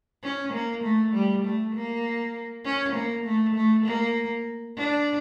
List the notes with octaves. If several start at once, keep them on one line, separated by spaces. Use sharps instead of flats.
C#4
A#3
A3
G3
A3
A#3
C#4
A#3
A3
A3
A#3
D4